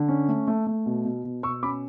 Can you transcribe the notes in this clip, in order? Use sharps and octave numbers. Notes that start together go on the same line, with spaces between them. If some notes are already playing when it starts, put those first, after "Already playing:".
Already playing: D3
C#4
A3
A3
A3
B2
B2
B2
B2 C#6 E6
C#4 B5 D6